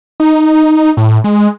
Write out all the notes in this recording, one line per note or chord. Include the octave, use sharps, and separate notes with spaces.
D#4
A2
G#3